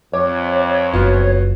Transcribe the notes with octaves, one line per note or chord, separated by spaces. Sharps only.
F2 C#5 D6
F#1 B3 F4 F#4